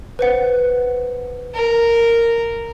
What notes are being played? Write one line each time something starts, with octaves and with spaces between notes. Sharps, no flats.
B4 C5 F#5
A#4